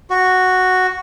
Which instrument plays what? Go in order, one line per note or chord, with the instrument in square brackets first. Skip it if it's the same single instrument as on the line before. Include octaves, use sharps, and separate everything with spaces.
[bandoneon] F#4